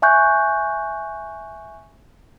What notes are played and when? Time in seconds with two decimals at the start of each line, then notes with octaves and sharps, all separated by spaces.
0.02 E5 G#5 C#6 F#6 G6